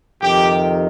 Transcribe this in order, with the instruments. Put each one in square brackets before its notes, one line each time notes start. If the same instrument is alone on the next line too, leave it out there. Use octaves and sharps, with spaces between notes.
[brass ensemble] F2 C3 D#3 G4